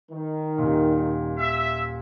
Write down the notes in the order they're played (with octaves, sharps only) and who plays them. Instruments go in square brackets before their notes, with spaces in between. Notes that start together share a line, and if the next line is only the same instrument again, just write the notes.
[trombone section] D#3
[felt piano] D#1 A#2
[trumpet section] E5